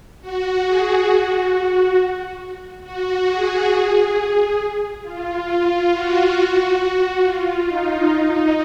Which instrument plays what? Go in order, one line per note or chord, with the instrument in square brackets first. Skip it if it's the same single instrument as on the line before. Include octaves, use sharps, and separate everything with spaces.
[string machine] F#4
G#4
F#4
F#4
G#4
F4
F4
F#4
F#4
F4
D#4
D#4